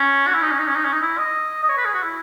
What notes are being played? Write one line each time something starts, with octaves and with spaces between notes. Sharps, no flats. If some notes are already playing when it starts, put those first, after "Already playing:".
Already playing: C#4
F#4
E4
D#4
C#4
D#4
C#4
D#4
C#4
D#4
E4
D#5
D#5
C#5
B4
G#4
F#4
E4